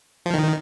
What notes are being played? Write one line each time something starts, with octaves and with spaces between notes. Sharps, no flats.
F3
D#3